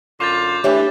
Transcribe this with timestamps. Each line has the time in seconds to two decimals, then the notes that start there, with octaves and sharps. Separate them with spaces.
0.20 F#2 D3 F4 D6 G6 A6
0.64 E3 A3 D4 G4 C#5 E5